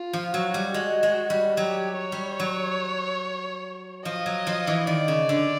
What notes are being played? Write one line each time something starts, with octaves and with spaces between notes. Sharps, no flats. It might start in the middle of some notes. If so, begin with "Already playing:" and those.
Already playing: F4
F3
F#3 F#4
G3
G#3 F#4
G#3
G3
F#3 G4
C#5
G3
F#3
F3 D#5
F#3
F3
E3
D#3 D5
C#3
D3